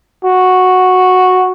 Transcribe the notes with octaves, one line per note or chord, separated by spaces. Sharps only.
F#4